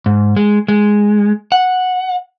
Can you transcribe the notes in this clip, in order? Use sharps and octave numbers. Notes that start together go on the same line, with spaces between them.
G#2
G#3
G#3
F#5